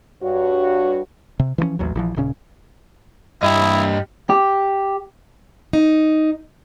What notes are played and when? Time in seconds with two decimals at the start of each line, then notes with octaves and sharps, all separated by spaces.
0.22 G2 F#4 C#5
1.39 C3
1.58 E3 F3 G#3 C#4
1.79 A1 D#2 F#3
1.95 A#1 E3 F3
2.16 D#1 A#2 C#3 C#4
3.43 G2 E4 G4 D#5
4.30 G4
5.73 D#4